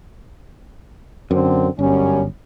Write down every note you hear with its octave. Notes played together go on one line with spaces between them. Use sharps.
F#2 D3 C4
G1 F#2 G3 C#4